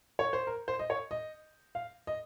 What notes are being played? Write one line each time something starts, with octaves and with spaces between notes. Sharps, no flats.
C#5
C5
A#4
C5
D#5
C#5
D#5
F5
D#5